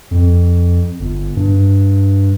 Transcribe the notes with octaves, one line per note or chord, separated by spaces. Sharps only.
F2
G1
G2